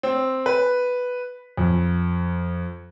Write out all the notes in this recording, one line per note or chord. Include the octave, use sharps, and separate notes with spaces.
C4
B4
F2